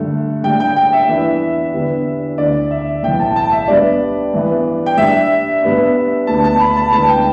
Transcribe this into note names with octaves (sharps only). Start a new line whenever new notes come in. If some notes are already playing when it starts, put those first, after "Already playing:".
Already playing: G2 D3 A3
G2 G3 D4 G5
G5
G5
E5
E2 E3 B3 D4
E2 D3 G3 B3 D4
D2 D3 A3 D4 D5
E5
B1 A2 E3 G5
A5
A5
E5
G2 G3 B3 D4 D5
G2 E3 B3
G5
G2 G3 D4 E5
G2 G3 B3 D4
D2 D3 B3 D4 A5
A5
B5
A5
E1 D2 D3 B3 D4 A5
G5